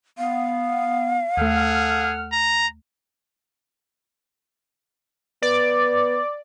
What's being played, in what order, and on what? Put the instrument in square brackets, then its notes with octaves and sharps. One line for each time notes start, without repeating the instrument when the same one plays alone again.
[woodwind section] B3 [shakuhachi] F5
[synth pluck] D#2 A3 [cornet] G#4 [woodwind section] A4 F#5 F6
[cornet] A#5
[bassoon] B3 [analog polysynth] D5